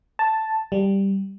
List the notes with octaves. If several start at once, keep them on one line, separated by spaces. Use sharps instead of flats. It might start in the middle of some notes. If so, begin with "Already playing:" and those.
A5
G3